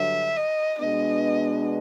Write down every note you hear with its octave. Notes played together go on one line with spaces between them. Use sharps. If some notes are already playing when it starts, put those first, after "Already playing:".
Already playing: G2 D3 F#3 E5
D#5
B2 G#3 B3 D4 D#5